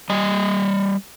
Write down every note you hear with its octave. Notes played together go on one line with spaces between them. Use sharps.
G3 D#5